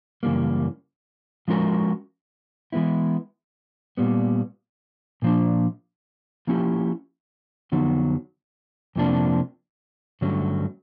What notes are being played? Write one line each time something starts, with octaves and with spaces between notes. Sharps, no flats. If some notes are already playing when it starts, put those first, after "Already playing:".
F#2 C#3 E3 G3 A#3
F3 G#3 C#4 F#4 A#4
E3 G#3 B3 E4
A#2 G3 B3
A#2 F3 A#3 D4
F3 A#3 C#4 E4 G4
F2 D3 F#3 B3 D#4
F2 C3 F3 A#3 D4
G2 D3 F#3 A3 C#4